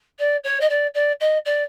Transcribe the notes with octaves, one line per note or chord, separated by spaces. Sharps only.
D5
C#5
D#5
D5
D5
D#5
D5